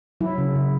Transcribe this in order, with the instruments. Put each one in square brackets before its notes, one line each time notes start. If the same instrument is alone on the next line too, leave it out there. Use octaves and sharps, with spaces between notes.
[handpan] F#3 E4
C#3
C#3